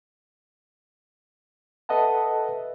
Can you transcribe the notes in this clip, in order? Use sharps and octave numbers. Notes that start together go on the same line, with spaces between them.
A4 B4 D#5 E5 F#5 A5